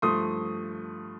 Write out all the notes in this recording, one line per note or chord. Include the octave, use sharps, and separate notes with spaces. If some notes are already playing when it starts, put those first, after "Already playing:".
G2 F3 A3 C6 D#6